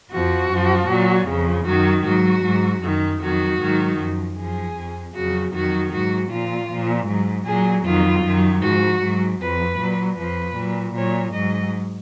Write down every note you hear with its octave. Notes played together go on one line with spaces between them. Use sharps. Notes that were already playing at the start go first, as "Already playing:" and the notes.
F2 F3 F#4
F#2 F3
A#2 F#3
F2 C#3 F3
F#2 D#3 F#3 F#4
G#2 F#3 F#4
G#2 F#3
F#2 D#3 F#3
F2 D#3 F#3 F#4
G#2 D#3 F#3
F#2 F3
F#2 F3 G#4
F2 F3
F2 C#3 F#3 F#4
F2 D#3 F#3 F#4
G#2 F#3 F#4
A#2 F3 F4
A#2 F3
G#2 F#3
A#2 F#3 G#4
F2 D#3 F#3 F4
F#2 D#3 F#3
G#2 F3 F#4
G#2 F#3
F2 F3 B4
A#2 F#3
F2 F3 B4
A#2 F#3
A#2 F#3 C#5
G#2 F#3 D#5